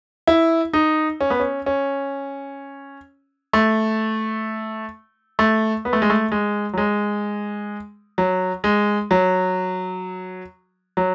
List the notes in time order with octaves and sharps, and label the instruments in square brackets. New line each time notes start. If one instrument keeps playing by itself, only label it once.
[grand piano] E4
D#4
C#4
B3
C#4
C#4
A3
A3
B3
A3
G#3
A3
G#3
F#3
G#3
F#3
G#3
F#3
F#3